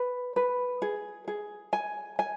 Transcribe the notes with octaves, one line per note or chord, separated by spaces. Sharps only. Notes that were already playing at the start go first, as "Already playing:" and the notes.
Already playing: B4
B4
G#4
G#4
G#5
G#5